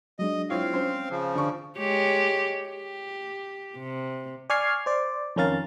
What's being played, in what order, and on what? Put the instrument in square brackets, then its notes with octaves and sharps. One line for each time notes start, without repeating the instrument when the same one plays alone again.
[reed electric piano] F#3 G#3 D4 [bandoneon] D#5
[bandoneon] C4 F5 [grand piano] E4 F4 C#5
[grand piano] C#4 C5
[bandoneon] C#3 F3
[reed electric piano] D3 [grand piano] D4 C#6
[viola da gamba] G#3 G4 C#5
G4
C3
[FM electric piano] D5 G#5 C#6 F6 G#6 C7
C5 D5
F2 D#3 C#4 A#4 F5 A6